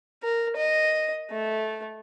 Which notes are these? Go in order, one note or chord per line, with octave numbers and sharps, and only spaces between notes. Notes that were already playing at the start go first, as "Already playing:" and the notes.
A#4
D#5
A3